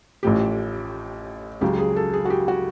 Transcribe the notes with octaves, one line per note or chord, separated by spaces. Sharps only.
A1 A2 F3 G4
C#2 C#3 F#3 G4
G#4
A4
G#4
F#4
G4
F#4